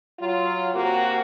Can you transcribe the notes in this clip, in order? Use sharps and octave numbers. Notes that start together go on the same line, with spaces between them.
F#3 F4
C3 A#3 F#4